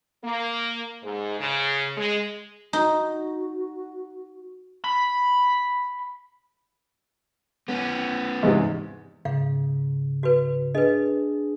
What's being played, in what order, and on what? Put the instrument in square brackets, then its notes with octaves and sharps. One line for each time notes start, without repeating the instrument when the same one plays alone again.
[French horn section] A#3
G#2
C#3
G#3
[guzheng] D#4 [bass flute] F#4
[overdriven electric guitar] B5
B3 C#4
[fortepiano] E2 G#2 [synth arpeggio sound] C3 G#3
[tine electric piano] G#2 C#3 [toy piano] F5
[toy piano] F#4 B4
[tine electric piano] D4 G#4 [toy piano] B4 D#5